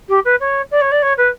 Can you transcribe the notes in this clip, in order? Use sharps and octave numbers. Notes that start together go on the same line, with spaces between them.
G4
B4
C#5
D5
C#5
D5
C#5
B4